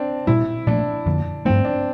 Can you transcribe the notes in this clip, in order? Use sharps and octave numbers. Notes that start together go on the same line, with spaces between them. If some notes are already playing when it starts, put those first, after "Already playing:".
Already playing: C4 D4
A#2 G3 D4 E4
A#2 F3 A3 D4
F2 D3 F3 A#3
G2 F3 A3 C4
D4